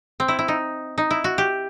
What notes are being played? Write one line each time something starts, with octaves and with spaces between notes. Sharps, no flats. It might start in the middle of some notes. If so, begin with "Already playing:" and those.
C4
E4
E4
D#4
D#4
E4
F#4
G4